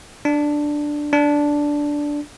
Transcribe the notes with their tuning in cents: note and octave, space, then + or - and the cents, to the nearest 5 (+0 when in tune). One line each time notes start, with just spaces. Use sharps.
D4 +5
D4 -5